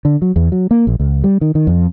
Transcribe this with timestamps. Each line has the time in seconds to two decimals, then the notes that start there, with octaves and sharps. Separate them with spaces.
0.05 D3
0.22 F#3
0.36 E2
0.52 F#3
0.71 A#3
0.87 A#1
1.00 C#2
1.24 G3
1.41 D#3
1.55 D#3
1.67 F2